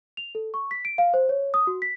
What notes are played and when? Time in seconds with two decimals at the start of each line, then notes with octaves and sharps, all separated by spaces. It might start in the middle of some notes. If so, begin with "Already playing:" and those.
0.17 F7
0.35 A4
0.54 C#6
0.71 B6
0.85 D7
0.98 F5
1.14 C5
1.29 C#5
1.54 D#6
1.67 F#4
1.82 B6